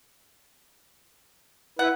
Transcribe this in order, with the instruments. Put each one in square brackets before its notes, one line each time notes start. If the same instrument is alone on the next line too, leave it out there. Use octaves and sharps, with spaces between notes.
[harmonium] E4 B4 [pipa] F#5